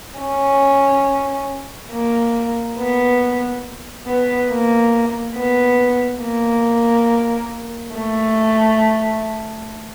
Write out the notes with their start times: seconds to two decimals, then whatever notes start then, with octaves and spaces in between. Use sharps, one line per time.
0.19 C#4
1.92 A#3
2.78 B3
4.07 B3
4.50 A#3
5.37 B3
6.23 A#3
7.96 A3